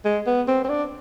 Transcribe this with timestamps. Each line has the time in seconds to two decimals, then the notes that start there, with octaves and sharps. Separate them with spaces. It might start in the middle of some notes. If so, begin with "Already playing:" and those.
0.05 G#3
0.27 B3
0.48 C4
0.65 C4
0.69 D4